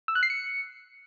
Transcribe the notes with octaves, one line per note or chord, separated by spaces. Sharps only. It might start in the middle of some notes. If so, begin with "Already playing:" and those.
E6
F#6
C7
C#7